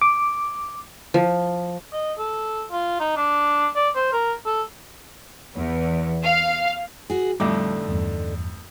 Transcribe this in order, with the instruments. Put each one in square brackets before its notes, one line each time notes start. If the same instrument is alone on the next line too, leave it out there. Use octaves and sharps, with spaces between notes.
[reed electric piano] D6
[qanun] F3
[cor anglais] D#5
A4
F4
D#4
D4
D5
C5
A#4
A4
[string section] E2
F5
[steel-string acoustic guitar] F#4 G#4
[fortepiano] F2 A2 D6 [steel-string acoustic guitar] D3 D#4 [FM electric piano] G3
[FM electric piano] E2 G2